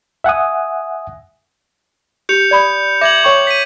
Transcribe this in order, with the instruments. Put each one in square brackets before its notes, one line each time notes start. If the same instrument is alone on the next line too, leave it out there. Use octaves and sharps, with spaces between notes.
[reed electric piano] E5 F#5 G#5 D#6
[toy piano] G4 [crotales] G6 C#7 F7
[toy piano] D5 B5 D#6
[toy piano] E5 [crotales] D6 G#6 F#7
[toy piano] C#5 G5 C#6
[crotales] B6 D#7